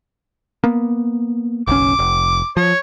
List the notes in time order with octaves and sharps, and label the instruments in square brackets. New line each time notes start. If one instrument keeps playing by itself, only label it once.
[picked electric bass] A#3 B3
[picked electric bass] F#1 B1 C#4 [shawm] D6
[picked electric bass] F1
[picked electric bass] F3 [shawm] C#5